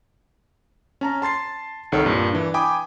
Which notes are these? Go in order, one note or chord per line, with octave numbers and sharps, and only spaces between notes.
C#4 A5 A#5
A5 C6 A6 C7
C2 D#3 A4 C#5
G2 A#2
E3 D4
G5 G#5 B5 D6 D#6